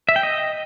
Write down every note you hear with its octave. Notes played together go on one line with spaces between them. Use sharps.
E5
G5
D#5